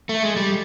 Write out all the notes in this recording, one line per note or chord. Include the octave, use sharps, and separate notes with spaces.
A3
G#3
G3